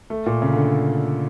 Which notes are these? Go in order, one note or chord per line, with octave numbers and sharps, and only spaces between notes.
A3
A#2
C#3
D3